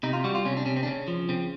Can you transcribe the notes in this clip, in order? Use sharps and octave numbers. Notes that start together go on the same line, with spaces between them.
C3 D#4
F4
G3 F#4
F4
C3 C#4
D4
C3 C#4
C4
D4
C#3 C#4
F3
C#3 C4